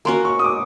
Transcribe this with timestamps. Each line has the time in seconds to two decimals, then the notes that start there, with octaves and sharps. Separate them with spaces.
0.05 A#3 C#4 F#4 C6
0.25 C#6
0.39 D#6
0.44 D6